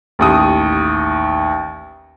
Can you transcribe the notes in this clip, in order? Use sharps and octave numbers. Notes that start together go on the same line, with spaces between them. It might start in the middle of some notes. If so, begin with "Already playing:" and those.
A1 D#2 D#6